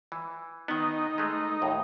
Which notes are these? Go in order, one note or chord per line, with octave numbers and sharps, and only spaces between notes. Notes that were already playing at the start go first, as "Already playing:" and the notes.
E3
D#3 B3 D#4
G#3 A3
D#2 A2